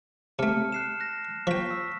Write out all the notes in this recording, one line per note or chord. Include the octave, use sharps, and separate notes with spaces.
C3 A3 A5 F6 C#7
F#6 C7 E7
F#6 A#6
F3 G5 C#6 B6
E6 B6